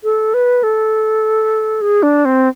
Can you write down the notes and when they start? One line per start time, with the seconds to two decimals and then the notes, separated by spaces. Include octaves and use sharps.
0.04 A4
0.34 B4
0.63 A4
1.81 G#4
2.03 D4
2.25 C4